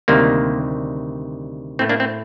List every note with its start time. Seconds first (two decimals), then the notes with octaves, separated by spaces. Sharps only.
0.08 D2 C3 D#3 G3 A#3
1.79 A2 A3 C4
1.89 A#3 D4
2.00 C4